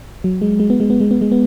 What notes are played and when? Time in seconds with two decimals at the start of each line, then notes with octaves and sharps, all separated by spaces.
0.24 F#3
0.41 G#3
0.60 G#3
0.70 B3
0.80 G#3
0.90 B3
1.00 G#3
1.11 B3
1.21 G#3
1.32 B3